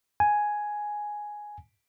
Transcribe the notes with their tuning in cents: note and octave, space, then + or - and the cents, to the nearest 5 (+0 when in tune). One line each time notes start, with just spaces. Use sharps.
G#5 +5